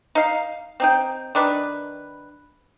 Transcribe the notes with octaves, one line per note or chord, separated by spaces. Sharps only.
D#4 F5
C4 D#4 G5
D#3 D4 B4